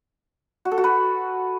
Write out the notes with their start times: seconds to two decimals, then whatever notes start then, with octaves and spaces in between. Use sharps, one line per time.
0.65 F#4
0.71 A4
0.78 F#4
0.84 B4